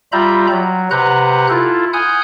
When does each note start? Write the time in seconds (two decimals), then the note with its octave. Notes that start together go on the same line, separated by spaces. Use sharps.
0.12 G3 F4 E5 A#5 B5 G6
0.52 F#3
0.91 C3 B4 F#5 A#5 F#6 G6
1.50 E4 F4 A4
1.93 F#5 G#5 D#6 F6 G6